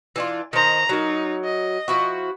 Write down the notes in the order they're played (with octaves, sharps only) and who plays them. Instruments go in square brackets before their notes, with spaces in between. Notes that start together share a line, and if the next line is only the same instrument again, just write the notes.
[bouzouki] E3 D4 F4
[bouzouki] D#3 C5 [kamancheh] D#5 A#5
[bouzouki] F#3 A#4 [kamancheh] D#4
[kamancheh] D#5
[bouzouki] F3 E4 F#4